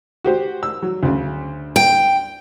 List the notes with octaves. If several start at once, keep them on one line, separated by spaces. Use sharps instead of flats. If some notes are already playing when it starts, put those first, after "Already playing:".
F#4 G4 C5
E6
F#3
D2 C#3
G5